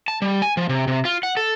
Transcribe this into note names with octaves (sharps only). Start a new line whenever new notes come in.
A5
G3
G#5
F3
C3
C3
F4
F#5
A4